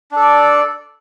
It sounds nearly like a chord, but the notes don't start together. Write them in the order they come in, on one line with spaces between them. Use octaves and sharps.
D4 A4 D5